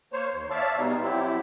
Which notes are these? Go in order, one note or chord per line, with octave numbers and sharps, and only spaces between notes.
A#3 C5 C#5
D#2
C#5 D5 E5 F5 A5
B2 G3 G#3 B3 D#4
F#3 C4 E4 G4